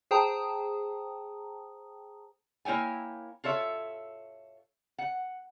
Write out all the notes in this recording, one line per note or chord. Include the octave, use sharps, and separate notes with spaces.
G#4 C5 G5 A5 A#5 D#6
A#3 E4 C#5 G5 G#5
F4 A4 C#5 E5
F#5